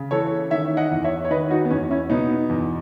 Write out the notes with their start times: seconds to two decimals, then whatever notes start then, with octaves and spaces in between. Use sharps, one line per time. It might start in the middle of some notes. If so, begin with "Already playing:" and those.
Already playing: C#3
0.11 E3 A4 C#5
0.51 D#3 C#5 E5
0.77 D#5 F#5
0.91 E2
1.04 C#5 E5
1.25 C#5
1.30 D#3 B4 D#5
1.50 D#4 F#4
1.65 B3
1.70 E2 C#4
1.91 C#4 E4
2.10 B2 B3 D#4
2.49 E2